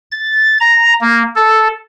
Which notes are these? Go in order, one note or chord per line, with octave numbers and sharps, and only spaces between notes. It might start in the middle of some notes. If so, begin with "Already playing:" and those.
A6
A#5
A#3
A4